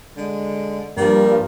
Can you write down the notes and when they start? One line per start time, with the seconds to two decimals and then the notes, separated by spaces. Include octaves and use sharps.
0.17 D3 G#3
0.97 G2 F3 G3 A#3